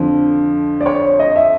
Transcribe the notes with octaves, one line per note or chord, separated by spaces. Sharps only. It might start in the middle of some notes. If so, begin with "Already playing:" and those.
Already playing: F2 D3 F3
D5
C#5
D#5
E5